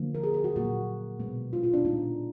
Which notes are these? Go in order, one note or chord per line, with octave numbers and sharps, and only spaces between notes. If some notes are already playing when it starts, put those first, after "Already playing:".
Already playing: D3 F3 A#3
A#4
G#4
G#4
F#4
A#2 F#3 A#3 F#4
B2 G#3 B3
F4
F4
D4
A#2 G#3 B3 D#4